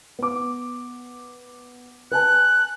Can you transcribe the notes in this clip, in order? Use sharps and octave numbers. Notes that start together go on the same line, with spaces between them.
B3 D6
B4 G#5 A5 F#6